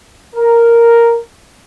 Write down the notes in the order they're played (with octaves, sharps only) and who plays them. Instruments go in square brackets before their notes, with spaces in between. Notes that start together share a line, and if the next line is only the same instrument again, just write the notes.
[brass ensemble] A#4